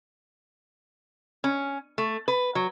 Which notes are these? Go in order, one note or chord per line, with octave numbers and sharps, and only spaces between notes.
C#4
A3
B4
F#3